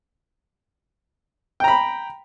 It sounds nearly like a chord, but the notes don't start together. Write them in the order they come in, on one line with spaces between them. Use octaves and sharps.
G5 A#5 B5